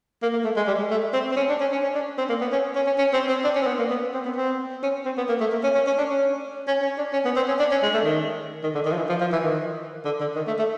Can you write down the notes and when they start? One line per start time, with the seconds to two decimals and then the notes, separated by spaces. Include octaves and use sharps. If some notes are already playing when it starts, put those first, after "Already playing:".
0.22 A#3
0.33 A#3
0.44 A3
0.57 G#3
0.68 G3
0.79 G#3
0.91 A3
1.13 C4
1.31 C4
1.37 C#4
1.49 D4
1.61 C#4
1.72 C#4
1.83 C#4
1.95 D4
2.18 C4
2.29 A#3
2.41 B3
2.52 C#4
2.76 C#4
2.87 C#4
2.98 C#4
3.14 C4
3.29 C4
3.44 D4
3.56 C#4
3.62 C4
3.67 B3
3.79 A#3
3.90 B3
4.14 C4
4.25 B3
4.36 C4
4.83 C#4
5.05 C4
5.18 B3
5.29 A#3
5.41 A3
5.52 A#3
5.63 C#4
5.75 C#4
5.87 C#4
5.98 D4
6.09 C#4
6.68 C#4
6.82 C#4
6.98 D4
7.13 C#4
7.25 B3
7.36 C4
7.48 C#4
7.59 D4
7.71 C#4
7.83 G#3
7.94 A3
8.05 D#3
8.64 D#3
8.75 D3
8.86 D#3
8.92 F3
8.97 E3
9.09 F3
9.21 F3
9.33 E3
9.43 D#3
10.05 D3
10.21 D3
10.36 D#3
10.47 A3
10.59 A3